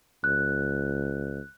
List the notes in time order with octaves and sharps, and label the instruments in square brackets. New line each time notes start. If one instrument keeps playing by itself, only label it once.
[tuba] C#2 [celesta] F#6